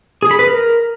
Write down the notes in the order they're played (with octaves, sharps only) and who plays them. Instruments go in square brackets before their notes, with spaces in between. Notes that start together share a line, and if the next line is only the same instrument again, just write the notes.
[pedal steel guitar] G#4
B5
B4
A#4